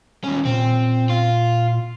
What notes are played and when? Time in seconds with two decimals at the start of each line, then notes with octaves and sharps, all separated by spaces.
0.24 D#2 C#4
0.45 A#2 C4
1.10 F4